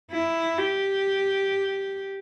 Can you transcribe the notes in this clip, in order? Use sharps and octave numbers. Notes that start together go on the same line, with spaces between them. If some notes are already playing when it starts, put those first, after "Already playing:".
E4
G4